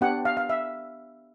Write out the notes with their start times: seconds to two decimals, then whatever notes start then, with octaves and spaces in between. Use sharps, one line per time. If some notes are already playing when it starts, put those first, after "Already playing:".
0.01 B3 D4 G4 F#5
0.25 F5
0.37 F5
0.50 E5